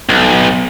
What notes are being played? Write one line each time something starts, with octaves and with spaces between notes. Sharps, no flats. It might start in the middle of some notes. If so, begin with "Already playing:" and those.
B1